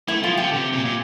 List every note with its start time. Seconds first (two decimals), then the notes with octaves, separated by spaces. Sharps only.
0.08 A3 E4
0.23 F3 F4
0.37 D3 G4
0.53 C3
0.73 A#2
0.85 A#2